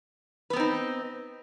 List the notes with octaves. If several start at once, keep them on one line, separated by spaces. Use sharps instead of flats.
B3 C4 D#4 B4